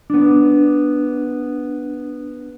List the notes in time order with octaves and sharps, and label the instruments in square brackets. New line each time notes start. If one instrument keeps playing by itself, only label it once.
[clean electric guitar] B3 D4